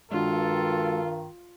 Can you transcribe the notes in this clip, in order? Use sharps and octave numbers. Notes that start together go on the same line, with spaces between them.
G2 D#3 G#3 D4 F4 F#4 A4